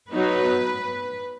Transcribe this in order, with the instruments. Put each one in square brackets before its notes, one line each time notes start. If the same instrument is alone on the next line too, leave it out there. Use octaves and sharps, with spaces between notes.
[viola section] F#3 B3 D#4 [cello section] B4